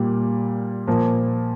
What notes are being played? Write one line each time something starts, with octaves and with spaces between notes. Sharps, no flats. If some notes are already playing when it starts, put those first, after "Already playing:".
Already playing: A#2 G3 A#3
A#2 F3 A#3